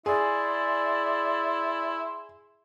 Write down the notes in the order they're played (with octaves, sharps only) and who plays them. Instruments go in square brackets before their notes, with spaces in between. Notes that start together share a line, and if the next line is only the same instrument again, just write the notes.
[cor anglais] E4 [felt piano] G#4 [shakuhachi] D5 [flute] C6